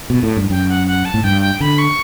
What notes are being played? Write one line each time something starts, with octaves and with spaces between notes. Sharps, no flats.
B2
A2
G2
F#2 G5
F#5
F#5
A5
A2
G2 G5
G5
D3 B5
C#6